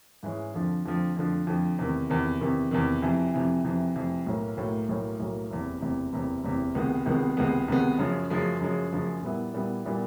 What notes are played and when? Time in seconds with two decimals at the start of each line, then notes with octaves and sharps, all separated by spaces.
0.23 G#2 E3 G#3 C#4
0.54 F2 D3 F3
0.86 F2 D3 F3
1.17 F2 D3 F3
1.47 F2 D3 F3
1.79 E2 C3 D#3
2.10 E2 C3 D#3
2.41 E2 C3 D#3
2.71 E2 C3 D#3
3.02 F2 C3 E3
3.34 F2 C3 E3
3.64 F2 C3 E3
3.96 F2 C3 E3
4.26 B1 A2 F#3 A#3
4.57 B1 A2 F#3 A#3
4.89 B1 A2 F#3 A#3
5.20 B1 A2 F#3 A#3
5.50 F#1 E2 C3
5.81 F#1 E2 C3
6.13 F#1 E2 C3
6.44 F#1 E2 C3
6.75 C#2 C3 D#3 G#3 B3
7.06 C#2 C3 D#3 G#3 B3
7.37 C#2 C3 D#3 G#3 B3
7.68 C#2 C3 D#3 G#3 B3
7.99 F#2 C#3 F3 G#3
8.30 F#2 C#3 F3 G#3
8.60 F#2 C#3 F3 G#3
8.92 F#2 C#3 F3 G#3
9.23 A#2 G3 B3 E4
9.54 A#2 G3 B3 E4
9.85 A#2 G3 B3 E4